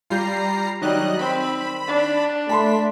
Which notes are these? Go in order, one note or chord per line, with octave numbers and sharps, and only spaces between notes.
G3 F4 A#5 G6 C7
D#3 F#3 G3 D#5 F#6
C4 B5
D4
A3 A5 B5 C6 B6